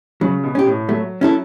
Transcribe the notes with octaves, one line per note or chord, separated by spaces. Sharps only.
C#3 F#3
B2
C#4 G4
A2
F#3 A3
F#3 C#4 E4 A4